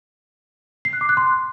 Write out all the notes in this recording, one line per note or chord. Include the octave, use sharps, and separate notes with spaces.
C7
F#6
D6
F#6
C6